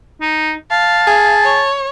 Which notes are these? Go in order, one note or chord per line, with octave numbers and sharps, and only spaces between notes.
D#4
F5 A5
G#4
C#5